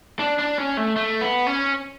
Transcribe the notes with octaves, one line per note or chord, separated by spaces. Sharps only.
D4
D4
C#4
A3
A3
B3
C#4